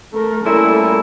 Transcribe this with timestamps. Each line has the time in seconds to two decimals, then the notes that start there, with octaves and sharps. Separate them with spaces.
0.14 A3 A#4
0.44 A#2 G3 A3 C#4 E4